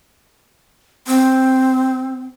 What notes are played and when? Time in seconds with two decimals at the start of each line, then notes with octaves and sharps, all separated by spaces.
1.07 C4